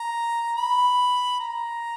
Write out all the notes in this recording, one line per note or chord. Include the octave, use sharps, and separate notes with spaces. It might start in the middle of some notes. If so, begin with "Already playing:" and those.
Already playing: A#5
B5
A#5